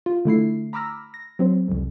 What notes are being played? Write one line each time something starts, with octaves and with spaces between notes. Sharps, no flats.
F4
D3 A3 E4 C7
A#5 B5 D6 E6 F6 A#6
A#6
F#3 C4 C5
C2 F2